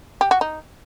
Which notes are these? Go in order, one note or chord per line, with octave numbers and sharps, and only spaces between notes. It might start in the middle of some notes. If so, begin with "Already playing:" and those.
G4
F#4
D#4